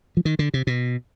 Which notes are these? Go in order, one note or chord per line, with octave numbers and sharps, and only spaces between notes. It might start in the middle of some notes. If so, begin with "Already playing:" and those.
F3
D#3
D3
C3
B2